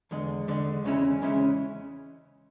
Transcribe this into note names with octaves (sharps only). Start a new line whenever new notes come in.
E2 D3 G#3
E2 D3 G#3
E2 C#3 G#3 C#4 E4
E2 C#3 G#3 C#4 E4